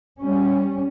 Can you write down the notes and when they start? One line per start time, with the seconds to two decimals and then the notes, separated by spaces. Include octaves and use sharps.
0.20 G3 C#4